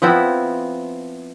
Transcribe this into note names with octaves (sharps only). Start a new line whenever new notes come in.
F3 B3 C4 E4